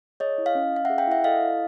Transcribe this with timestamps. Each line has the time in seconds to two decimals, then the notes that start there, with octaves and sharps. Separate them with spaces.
0.20 G#4 C#5 D#5
0.38 E4
0.46 D#5 F5
0.55 C#4
0.73 C#4 F5
0.85 G#4 E5 F#5
0.98 F5 G5
1.07 E4 E5 F#5
1.24 A4 D#5 F5
1.41 E4